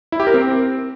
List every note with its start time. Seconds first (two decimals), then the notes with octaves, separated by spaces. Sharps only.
0.12 E4
0.20 G4
0.27 A#4
0.34 C4